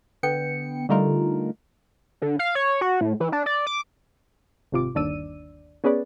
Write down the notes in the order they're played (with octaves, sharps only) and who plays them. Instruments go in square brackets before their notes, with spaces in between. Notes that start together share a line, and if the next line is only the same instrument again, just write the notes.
[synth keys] D3 B3 G5 C#7
D3 G3 A3 D#4 F4 A#4
[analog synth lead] D3
F5
C#5
F#4
A2
E3
D4
D5
D6
[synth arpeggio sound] G#1 C3 F4 D6
G1 D#2 D4 D5 E6 D#7
B3 C#4 G#4 B4 D5